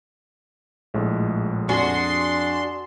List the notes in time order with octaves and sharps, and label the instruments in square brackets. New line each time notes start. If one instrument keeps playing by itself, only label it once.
[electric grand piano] A#1 A2 G#3
[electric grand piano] F2 [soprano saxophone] D4 [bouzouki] F#4 G#4 [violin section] C6